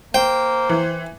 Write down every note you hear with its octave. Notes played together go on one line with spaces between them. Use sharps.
A#3 C5 G5
E3